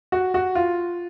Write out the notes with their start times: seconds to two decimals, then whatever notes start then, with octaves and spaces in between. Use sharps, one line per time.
0.12 F#4
0.34 F#4
0.55 F4